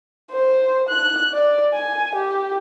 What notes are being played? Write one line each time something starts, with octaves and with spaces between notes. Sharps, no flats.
C5
F#6
D5
G#5
G4